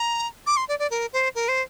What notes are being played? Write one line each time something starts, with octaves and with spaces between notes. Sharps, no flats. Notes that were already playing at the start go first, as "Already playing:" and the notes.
Already playing: A#5
D6
C6
D5
D5
A#4
C5
A#4
C5